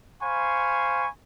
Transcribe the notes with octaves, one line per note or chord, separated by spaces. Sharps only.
C5 F5 G#5 B5 C#6